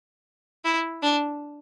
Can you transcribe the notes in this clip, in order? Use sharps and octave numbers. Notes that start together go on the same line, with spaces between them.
E4
D4